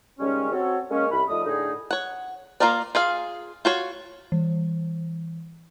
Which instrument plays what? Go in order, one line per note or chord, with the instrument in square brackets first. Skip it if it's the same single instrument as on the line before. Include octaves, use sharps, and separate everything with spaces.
[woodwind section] D#2 C#3 G3 G#3 C#4
C4 F#4 A4 C#5
G#3 A#3 C#4
C2 B5
F3 A3 D#4 D5 D#6
A2 D3 D#4 G#4
[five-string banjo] C#5 F#5
A#3 C#4 F4 A#4 D5
F4 G#4 F5
F4 F#4 C#5
[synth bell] E3